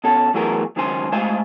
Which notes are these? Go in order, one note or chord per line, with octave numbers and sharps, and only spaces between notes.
B2 C#4 A4
E3 F#3 A3 B3 G#4 A#4
C#2 D#3 F#3 C#4 C5 G#5
G#3 A3 C5 F5 G#5